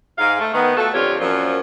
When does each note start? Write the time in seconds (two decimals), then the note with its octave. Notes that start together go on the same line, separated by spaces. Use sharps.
0.18 G#2 F5
0.39 A3
0.53 D#3 B3
0.76 A3 F4 F#4 A4
0.94 F2 D3 F4 G4 C#5
1.19 F#2 A#2 F3